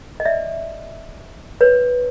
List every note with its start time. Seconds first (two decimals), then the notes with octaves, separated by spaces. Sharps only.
0.20 D#5
0.25 D5 E5
1.61 B4 C#5